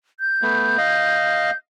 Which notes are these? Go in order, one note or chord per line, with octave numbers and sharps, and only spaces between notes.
G6
A3 B3
D#5 F5